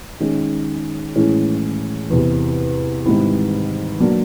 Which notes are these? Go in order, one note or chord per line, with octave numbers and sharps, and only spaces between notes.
D#3 G#3 C#4
A2 E3 G#3 C#4
E2 C3 E3
G#2 D#3 G3 C4 E4
F#3 A#3 D4